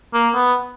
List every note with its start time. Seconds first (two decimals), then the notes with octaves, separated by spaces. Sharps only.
0.14 A#3
0.35 B3